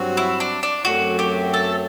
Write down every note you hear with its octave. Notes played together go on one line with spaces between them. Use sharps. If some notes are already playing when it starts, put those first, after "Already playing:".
Already playing: G2 F#3 C4 F#4
E4
D4
D4
F#2 F#3 A3 C4 F#4
G4
A4